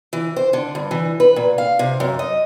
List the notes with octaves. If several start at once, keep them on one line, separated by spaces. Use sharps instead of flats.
E3
C5
D3
G2
E3
B4
A#2
F5
C3
F#2
D#5